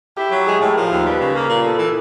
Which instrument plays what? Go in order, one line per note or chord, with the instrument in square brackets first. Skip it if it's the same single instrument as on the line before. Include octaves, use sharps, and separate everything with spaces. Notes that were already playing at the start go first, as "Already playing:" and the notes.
[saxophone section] E4 [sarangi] G4
[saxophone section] F#3
[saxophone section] G#3 [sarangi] G#4
[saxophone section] A2
[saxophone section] F3 [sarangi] A#4
[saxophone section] D#2
[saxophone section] G3 [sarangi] B4
[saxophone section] C#3
[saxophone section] A#3 [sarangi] A#4
[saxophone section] A#2
[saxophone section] B3 [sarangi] A4
[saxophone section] E3